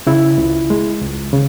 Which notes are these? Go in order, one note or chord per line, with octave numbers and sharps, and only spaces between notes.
C#3 E4
C#2
G#3
C#2
C#3